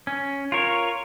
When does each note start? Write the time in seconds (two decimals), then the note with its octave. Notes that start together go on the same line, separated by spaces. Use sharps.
0.07 C#4
0.52 F4 A#4 C#5